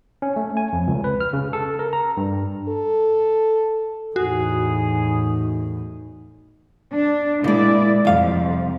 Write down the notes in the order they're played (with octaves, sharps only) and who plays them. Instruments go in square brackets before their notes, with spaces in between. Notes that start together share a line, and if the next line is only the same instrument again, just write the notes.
[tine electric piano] C#4
A3
G#5
F2
C#2
B4
F6
C#3
A4
A#4
A#5
G2
[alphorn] A4
[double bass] E2 A2 [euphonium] D#4 [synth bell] F#4 [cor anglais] G#4
[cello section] D4
[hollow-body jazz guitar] A#2 G#3 [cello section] E4 D5
[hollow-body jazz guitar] C2 F5 [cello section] F2